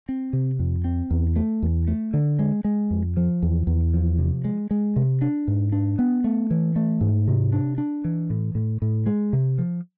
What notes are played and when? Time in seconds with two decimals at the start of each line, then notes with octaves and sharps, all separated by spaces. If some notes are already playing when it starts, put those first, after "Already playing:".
0.09 C4
0.33 C3
0.59 F2
0.85 C4
1.11 E2
1.36 A3
1.63 E2
1.88 A3
2.14 D3
2.39 G#3
2.64 G#3
2.91 F2
3.17 F3
3.42 E2
3.67 E2
3.94 F3
4.18 C3
4.45 G#3
4.71 G#3
4.96 C3
5.22 D4
5.48 G#2
5.72 D4
5.99 B3
6.24 A3
6.51 E3
6.76 A3
7.01 G#2
7.28 C3
7.53 D4
7.78 D4
8.04 E3
8.30 A2
8.55 A2
8.82 A2
9.06 G#3
9.33 C3
9.58 F3